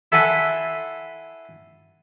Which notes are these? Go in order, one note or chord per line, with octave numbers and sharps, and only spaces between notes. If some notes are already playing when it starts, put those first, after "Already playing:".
E4 A4 F#5 G#5 B5 C6